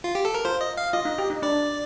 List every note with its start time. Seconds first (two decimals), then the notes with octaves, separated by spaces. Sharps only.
0.04 F4
0.15 G4
0.25 A4
0.35 A#4
0.45 F4 C5
0.61 D#5
0.77 F5
0.93 F4 D#5
1.05 D#4
1.18 G4
1.30 D#4
1.42 D4 D5